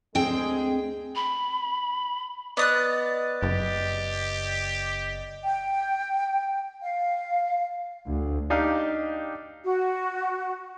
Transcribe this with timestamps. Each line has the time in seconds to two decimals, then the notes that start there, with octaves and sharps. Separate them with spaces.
0.15 D2 G#3 C4 G#4 G5
1.16 B5
2.57 B3 D5 D#5 D#6 F#6 A6
3.43 F#1 G4
5.44 G5
6.81 F5
8.07 D2
8.50 D4 D#4 G4 F5 G5
9.64 F#4